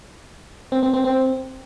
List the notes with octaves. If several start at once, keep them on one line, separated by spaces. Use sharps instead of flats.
C4
C4
C4
C4